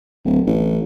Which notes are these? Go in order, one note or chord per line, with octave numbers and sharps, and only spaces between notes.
D1
A1